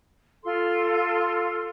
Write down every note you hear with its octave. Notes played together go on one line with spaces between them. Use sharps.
F4 A4 C6